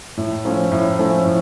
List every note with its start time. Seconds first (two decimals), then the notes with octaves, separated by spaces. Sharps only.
0.17 A2
0.45 F3 A3 C#4
0.72 A2
0.99 F3 A3 C#4
1.26 A2